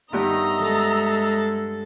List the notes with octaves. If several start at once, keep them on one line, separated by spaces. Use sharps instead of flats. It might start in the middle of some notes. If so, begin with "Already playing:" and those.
G2 D#3 B3 G4 D#5 E5 A#5
G#3 A4